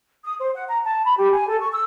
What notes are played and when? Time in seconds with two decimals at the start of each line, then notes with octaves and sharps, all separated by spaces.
0.24 D#6
0.39 C5
0.54 F#5
0.68 A#5
0.84 A5
1.05 B5
1.18 G4
1.33 G#5
1.48 A4
1.60 C#6
1.72 E6